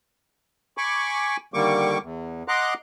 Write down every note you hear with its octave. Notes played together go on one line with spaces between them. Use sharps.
G#5 B5 C#6 D6
D3 D#3 G3 A#3 C#6 D6
E2
D#5 F#5 A#5 C6 D6 F#6